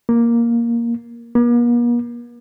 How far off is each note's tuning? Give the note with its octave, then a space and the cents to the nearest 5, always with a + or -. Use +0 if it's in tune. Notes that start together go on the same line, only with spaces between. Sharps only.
A#3 +5
A#3 +45